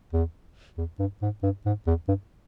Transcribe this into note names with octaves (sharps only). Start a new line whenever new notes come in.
E2
E2
G2
G#2
G2
G#2
E2
G2